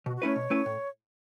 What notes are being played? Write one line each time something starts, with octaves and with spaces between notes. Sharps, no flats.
B2 F#4
F#4
A3 C#4 E4 B4 C#5
B2
A3 C#4 E4 B4
A2